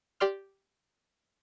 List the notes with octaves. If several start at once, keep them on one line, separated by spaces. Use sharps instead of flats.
G4 D5 C6 F6